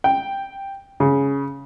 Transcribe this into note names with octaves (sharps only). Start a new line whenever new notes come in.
G5
C#3